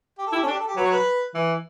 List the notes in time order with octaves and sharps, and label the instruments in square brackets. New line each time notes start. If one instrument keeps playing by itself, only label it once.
[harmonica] G4
A4
[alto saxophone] E4 [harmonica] G4
[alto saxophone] C#4 [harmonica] A4
[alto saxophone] D4
[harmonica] G4
A4
G4
[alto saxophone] F#3 [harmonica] B4
[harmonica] C#5
B4
[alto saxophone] E3